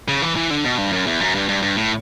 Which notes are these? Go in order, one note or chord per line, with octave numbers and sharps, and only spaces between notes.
C#3
E3
E3
D3
B2
G2
F#2
E2
F#2
G2
G2
G2
A2